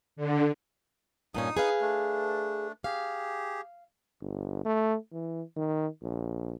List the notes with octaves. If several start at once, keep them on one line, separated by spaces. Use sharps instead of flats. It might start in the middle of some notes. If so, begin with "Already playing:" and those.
D3
G2 A#2 C#4 D#4 D#6
G#4 B4 F5
A3 D4
G4 G#4 F5
G1
A3
E3
D#3
A#1